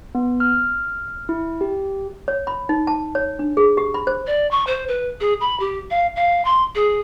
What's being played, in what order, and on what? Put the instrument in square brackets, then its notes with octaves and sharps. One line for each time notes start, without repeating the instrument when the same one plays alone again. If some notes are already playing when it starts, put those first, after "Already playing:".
[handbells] B3
F6
E4
G4
[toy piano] C#5
B5
D#4
A5
C#5
D4
G#4
G4
B5
C5
[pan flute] D5
C#6
C5
B4
G#4
B5
G4
F5
F5
C6
G#4